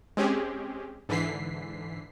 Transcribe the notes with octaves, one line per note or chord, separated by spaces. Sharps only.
G#3 C4 C#4 G4 G#4
G#2 D3 E3 B6 C7